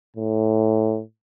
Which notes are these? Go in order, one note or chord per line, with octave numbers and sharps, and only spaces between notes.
A2